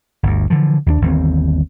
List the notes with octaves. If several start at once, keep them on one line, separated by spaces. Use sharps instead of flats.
G1 D2
D3 E3 F3
D#2 G#3 D4
G1 D#2 E3 C4